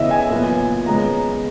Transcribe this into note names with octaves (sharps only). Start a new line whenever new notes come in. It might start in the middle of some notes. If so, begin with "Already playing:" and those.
Already playing: C#3 E3 B3 D#5 E5
G#5
A#2 F#3 B3
C#3 G#3 B3 A#5